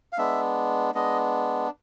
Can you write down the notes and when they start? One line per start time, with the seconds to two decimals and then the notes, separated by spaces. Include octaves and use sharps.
0.13 F5
0.18 G#3 B3 D4 E5
0.94 G#3 B3 D4 D#5